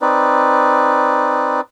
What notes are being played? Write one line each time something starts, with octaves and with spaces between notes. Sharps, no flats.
C4 D#4 B4 D5